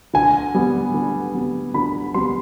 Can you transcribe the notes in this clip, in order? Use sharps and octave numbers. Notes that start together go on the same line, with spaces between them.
D3 G#5
G3 B3
D3
G3 B3
D3 B5
G3 B3 C6